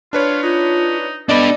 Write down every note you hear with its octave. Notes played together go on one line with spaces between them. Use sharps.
D4 F4 B4 C#5
D#4 F4
B3 D4 A4 B4 D5 D#5 D6